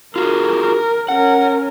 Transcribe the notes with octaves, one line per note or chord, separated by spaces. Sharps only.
F4 F#4 G#4 A#4
C#4 A#4 F#5